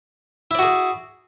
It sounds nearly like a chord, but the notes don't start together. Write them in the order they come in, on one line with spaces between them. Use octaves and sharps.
E4 D5 F#4 G#4